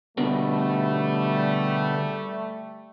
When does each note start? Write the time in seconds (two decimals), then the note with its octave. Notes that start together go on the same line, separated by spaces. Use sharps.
0.18 B2 D3 G3 A3 B3